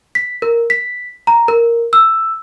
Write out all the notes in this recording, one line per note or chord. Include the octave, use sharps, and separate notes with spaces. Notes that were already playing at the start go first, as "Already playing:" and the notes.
B6
A#4
B6
A#5
A#4
E6